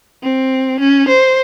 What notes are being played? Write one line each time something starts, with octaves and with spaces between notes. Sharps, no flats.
C4
C#4
C5